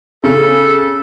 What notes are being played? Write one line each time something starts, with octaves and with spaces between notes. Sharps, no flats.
C#3 A4